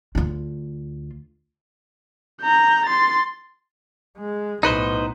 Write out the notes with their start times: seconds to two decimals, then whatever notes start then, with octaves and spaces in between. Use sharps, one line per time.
0.15 D2 F4
2.42 A#5 G6
2.86 C6 A6
4.18 G#3
4.63 B1 A2 D#4 B4 C5